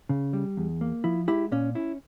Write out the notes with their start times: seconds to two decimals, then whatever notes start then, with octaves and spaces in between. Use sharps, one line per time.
0.09 C#3
0.33 G3
0.57 E2
0.81 A#3
1.04 F3 E4
1.28 G#3 E4 G4
1.51 A#2 C#4
1.75 C#4 E4